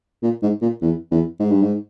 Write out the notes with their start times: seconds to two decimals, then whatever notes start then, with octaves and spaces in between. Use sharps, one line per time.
0.23 A#2
0.43 G#2
0.62 A#2
0.82 E2
1.11 E2
1.40 G#2
1.51 G2
1.62 G#2